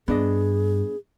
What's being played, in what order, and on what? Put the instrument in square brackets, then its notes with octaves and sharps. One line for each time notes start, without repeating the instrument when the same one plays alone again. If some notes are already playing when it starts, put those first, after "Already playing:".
[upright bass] G2 [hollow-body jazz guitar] B3 D4 D#5 [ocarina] G#4